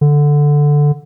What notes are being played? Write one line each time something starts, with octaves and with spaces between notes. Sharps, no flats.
D3